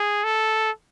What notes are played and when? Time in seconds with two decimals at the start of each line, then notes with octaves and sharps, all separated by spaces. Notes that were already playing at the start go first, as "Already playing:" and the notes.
Already playing: G#4
0.24 A4